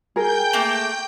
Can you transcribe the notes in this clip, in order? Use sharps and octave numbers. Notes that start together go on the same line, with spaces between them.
G#4 A#4 G5 G6
A3 A#3